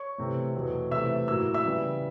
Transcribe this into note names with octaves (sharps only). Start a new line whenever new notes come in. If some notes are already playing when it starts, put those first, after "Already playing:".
Already playing: C#5 C#6
C3 E3 A3
E2 B2 F#3 A3
C3 E3 A3 E5 E6
A2 F#3 A#3 E6
E5 E6
C#3 E3 G3